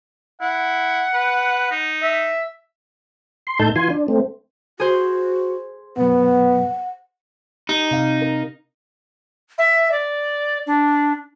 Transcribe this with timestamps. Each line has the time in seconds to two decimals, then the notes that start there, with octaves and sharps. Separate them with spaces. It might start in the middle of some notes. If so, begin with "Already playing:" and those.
0.41 E4 F#5
1.14 B4
1.71 D#4
2.03 E5
3.47 C6
3.59 A2 D#4 A4 A5 G6
3.76 E3 F4 G#5 C6
3.90 D4
4.08 A3 C4
4.80 F#4 G#4 C5
5.97 F#2 B2 F#3 B3 F#5
7.69 D#4 G4
7.91 C3 F5
8.22 A#4
9.58 E5
9.92 D5
10.67 D4